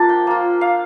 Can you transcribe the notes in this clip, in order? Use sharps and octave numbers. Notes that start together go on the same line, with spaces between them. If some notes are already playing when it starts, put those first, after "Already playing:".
Already playing: F3 A#3 D4 A5
G5
A#3 F4
F5